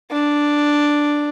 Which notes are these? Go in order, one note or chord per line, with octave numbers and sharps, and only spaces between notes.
D4